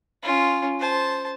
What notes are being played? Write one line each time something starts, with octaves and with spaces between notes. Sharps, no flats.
C#4 F4
C5 A5